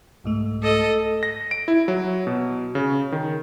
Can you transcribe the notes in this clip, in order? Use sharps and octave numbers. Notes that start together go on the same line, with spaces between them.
C2 G#2 A3
A4 D#5
A#6
D7
E4
F#3
B2
C#3
D#3